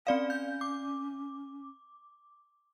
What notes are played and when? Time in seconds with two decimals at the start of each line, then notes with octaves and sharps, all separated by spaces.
0.07 C4 C#4 D5 F5
0.30 G6
0.61 D6